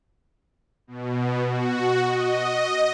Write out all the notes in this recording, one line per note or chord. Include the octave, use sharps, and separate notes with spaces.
B2
F#4
D#5